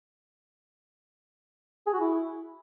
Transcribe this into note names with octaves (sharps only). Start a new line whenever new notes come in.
G#4
F#4
E4